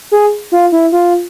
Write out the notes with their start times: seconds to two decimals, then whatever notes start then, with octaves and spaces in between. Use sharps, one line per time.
0.12 G#4
0.52 F4
0.72 E4
0.92 F4